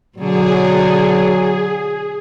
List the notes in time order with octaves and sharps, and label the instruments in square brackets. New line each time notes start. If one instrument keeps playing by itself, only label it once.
[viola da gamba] B2 D3 [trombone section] F#3 [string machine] G#4